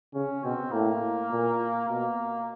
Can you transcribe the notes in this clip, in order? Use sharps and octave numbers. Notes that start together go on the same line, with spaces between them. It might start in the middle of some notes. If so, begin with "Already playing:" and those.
C#3 C#4
B2 C4
A2 A#3
A#2
B2 A#3